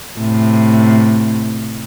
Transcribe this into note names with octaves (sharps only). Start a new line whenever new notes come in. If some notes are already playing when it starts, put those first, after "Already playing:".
A2 C3